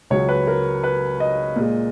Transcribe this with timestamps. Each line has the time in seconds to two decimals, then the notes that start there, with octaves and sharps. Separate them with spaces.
0.10 C#2 C#3 F#3 C#5
0.29 B4
0.47 A#4
0.84 B4
1.20 D#5
1.56 A#2 G#3